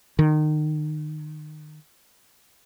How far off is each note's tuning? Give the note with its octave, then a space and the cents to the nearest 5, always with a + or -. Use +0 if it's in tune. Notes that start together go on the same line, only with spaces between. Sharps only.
D#3 -30